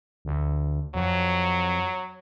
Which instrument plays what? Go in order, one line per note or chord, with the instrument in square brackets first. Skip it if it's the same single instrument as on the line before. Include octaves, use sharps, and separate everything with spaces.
[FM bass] D2
[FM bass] F2 [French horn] F#3